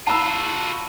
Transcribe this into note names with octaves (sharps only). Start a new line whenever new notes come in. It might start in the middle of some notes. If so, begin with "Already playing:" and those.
F4 F#4 A5 B5 E6